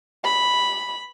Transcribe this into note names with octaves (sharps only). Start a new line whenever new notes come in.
B5